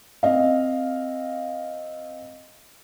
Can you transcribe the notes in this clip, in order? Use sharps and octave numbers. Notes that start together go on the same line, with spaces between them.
C4 D#5 F5